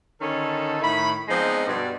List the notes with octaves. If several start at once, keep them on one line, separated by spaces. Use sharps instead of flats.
D3 D#3 C#4 D#4 A4
A2 D#3 E4 B5
F3 G#3 B3 C4 D4 D#4
G2 B2 D5